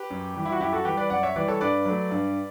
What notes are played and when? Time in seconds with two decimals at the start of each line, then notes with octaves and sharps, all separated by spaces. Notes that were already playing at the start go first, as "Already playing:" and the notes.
Already playing: G4 B4
0.10 F#2
0.35 E3 G3
0.45 E4
0.52 F#4
0.60 F#2 E4 G4
0.72 F#4 A4
0.85 E3 G3 G4 B4
0.97 B4 D5
1.10 F#2 D5 F#5
1.23 C#5 E5
1.35 E3 G3 B4 D5
1.48 A4 C#5
1.61 G2 B4 D5
1.86 F#3 A3
2.11 G2